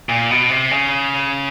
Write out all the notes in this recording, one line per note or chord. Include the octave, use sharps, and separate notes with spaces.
A#2
B2
C3
C#3